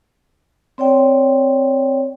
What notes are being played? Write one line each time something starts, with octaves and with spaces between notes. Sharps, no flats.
C4 C#5 D5 G5